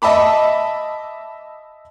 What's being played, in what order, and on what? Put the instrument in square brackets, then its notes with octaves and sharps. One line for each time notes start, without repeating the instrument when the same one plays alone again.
[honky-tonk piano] D#5 E5 A5 B5 D6